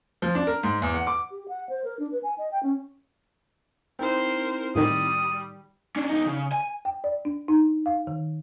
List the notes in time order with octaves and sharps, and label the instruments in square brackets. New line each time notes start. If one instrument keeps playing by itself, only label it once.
[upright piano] F3
D4
A#4
G#2
E2
F#5
D6
[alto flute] G4
F#5
C5
A#4
D4
B4
G#5
D#5
G5
C#4
[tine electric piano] C4 D#4 E4 [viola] A#4 C5
[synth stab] A2 D#3 [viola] G3 [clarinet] D#6
[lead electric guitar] C#4 D4
E2 D#4
C#3
G#5
[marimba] G5
D5
D4
D#4
F5
D#3